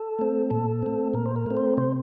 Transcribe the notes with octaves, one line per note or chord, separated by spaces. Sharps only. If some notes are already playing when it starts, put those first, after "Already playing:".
Already playing: A4
A3 C4
A#2 A4
A3 C4
A#2 A#4
C5
A#4
A3 C4
C5
C3 C5